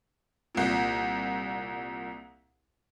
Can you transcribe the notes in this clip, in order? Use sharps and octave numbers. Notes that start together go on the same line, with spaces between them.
C2 A#2